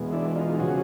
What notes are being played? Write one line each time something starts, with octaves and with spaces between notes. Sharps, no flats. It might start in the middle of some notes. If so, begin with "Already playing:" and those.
Already playing: E2 B2 G#3
D4 E4
D#4 F4
C#3 F3 F#4 G#4